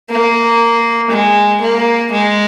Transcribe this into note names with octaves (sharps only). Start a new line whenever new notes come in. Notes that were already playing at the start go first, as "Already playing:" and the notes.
A#3
G#3
A#3
G#3